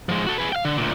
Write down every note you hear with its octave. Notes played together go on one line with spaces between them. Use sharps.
F3 G#3
F#4 A4
G#4 B4
F5 G5
D3
D2 A#2